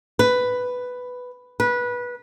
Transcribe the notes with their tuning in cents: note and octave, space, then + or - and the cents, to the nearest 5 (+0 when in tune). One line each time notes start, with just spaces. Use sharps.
B4 +5
B4 -20